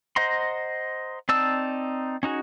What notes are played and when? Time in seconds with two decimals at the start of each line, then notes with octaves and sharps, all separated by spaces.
0.16 C5 D#5 F#5 A#5 C6
1.29 C4 D#4 D5 A5 E6
2.23 C#4 D#4 F#4 G#4